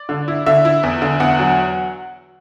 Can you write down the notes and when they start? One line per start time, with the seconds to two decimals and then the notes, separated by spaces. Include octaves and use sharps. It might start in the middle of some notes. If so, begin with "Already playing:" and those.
Already playing: D5
0.09 D3
0.28 E4
0.46 D3 E5
0.65 E4
0.83 E2
1.02 D3
1.20 E2 F#5
1.39 F#3